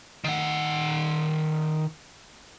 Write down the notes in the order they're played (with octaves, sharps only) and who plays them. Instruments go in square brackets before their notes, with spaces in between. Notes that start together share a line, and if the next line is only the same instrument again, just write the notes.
[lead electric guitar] D#3 F#5